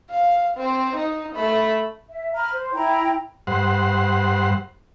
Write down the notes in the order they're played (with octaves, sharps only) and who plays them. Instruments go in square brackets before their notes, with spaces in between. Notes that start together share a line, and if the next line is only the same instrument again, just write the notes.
[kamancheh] F5
C4
D#4
A3 B5
[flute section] E5
A#5 B5 F6
C5
E4 G5 A#5 B5
[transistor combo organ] G2 C5 F#5